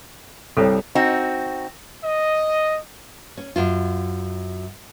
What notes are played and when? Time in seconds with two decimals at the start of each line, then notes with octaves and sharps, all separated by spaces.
0.57 C2 G3 A4 C5 C#5
0.95 C4 D#4 F#4
2.03 D#5
3.37 C#4
3.56 F#2 F4